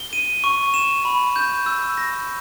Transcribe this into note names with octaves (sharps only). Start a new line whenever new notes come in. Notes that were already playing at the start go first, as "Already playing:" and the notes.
Already playing: G7
D#7
C#6
E7
B5
G6
E6
A#6